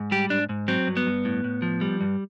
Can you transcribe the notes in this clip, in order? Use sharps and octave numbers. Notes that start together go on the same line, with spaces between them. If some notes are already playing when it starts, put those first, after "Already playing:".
Already playing: G#2
G3 G4
G#2 D4
G#2
F#3 C4
G2
B3
G2
A2
A2
F3
G3
G2